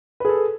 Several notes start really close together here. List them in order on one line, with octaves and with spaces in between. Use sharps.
B4 G#4 A4